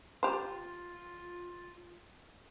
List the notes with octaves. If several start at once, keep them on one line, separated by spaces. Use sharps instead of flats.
F4 G4 C5